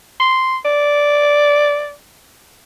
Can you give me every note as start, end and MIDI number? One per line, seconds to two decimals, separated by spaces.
0.20 0.57 84
0.65 1.93 74